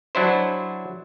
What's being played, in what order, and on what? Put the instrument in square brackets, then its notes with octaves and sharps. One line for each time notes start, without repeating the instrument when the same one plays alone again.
[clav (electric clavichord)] F#3 D4 E4 C5